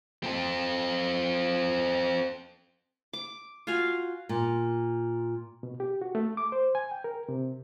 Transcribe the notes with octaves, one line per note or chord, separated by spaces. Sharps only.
C4 A4
D6
F4 F#4 F5 G#5
A#2
B2
G4
F#4
A3
D6
C5
G#5
G5
A#4
C3